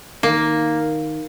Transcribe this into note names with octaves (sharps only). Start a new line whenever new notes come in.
D#3 A#3